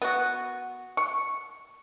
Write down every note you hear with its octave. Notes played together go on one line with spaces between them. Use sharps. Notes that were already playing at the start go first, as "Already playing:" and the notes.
B3 F#4
C#6